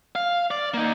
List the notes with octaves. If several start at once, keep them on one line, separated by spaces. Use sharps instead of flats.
F5
D5
A#3 D#4